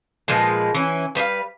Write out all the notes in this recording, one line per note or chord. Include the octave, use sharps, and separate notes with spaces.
A#2 F3 G#3 B4
E3 C#4
G3 B4 C5 F5